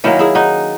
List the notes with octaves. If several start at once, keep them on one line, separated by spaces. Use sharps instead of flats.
D#3 F#3 A#3 C#4 E4
E4 G#4
D#4 F#4